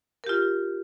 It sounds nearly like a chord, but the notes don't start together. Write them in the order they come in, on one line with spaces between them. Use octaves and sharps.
A#4 G4 F4